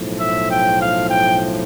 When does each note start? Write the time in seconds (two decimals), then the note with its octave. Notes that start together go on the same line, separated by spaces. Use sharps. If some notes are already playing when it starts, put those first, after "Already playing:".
Already playing: B1 A2 F3
0.20 E5
0.50 G5
0.79 F5
1.09 G5